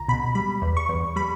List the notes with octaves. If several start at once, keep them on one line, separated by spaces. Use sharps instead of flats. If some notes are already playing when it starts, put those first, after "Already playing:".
Already playing: C#2 A#5
B2 B5
G3 B5
E2
C#6
E2
G3 B5